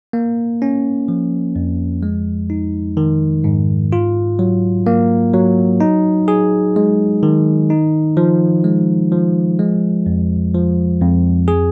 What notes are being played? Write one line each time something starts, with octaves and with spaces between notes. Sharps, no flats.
A#3
C#4
F3
F2
G#3
D#4
D#3
G#2
F4
F#3
A#3
F#3
D#4
G#4
G#3
D#3
D#4
F3
G#3
F3
G#3
F2
F3
F2
G#4